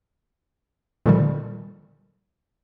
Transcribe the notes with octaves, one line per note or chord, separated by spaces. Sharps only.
A#2 D3 D#3 F3 G3